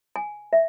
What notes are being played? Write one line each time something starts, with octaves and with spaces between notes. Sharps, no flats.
G#5
E5